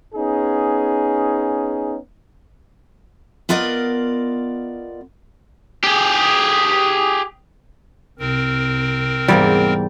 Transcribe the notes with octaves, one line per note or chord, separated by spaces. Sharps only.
B3 C#4 D#4 G#4
B3 F4 A#4 D5 D#5
G4 G#4
C2 C4 A#4
E2 G#2 G3 A#3